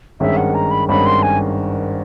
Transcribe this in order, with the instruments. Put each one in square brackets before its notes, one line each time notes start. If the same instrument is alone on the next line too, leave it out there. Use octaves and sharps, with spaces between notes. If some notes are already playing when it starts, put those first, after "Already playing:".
[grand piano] G#1 G2 D#3 G#3 C#4 [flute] E5
[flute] F#5
A#5
B5
[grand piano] G#1 G2 D#3 G#3 C#4 [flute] B5
[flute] C6
G#5